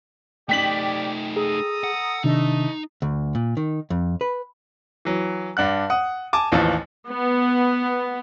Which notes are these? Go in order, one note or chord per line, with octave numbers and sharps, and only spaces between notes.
A3 A#3 D#4 G4 D5 G5 B6 F#7
G#4 A4 A#5 D#6
F#5
C3 D#3 A3 D4 D#4 D#5
D2
A#2
D#3
F2
B4
E3 F#3
G2 D4 F#5 F#6
F#5 D#6
G#5 A5 D6
A1 D#2 E3 F3 A5
B3